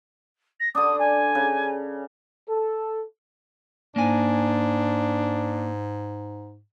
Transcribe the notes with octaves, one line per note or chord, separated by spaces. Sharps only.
A#6
D3 D4 D#6
G#5
C#3
A4
G#2 A#3 D4 G#5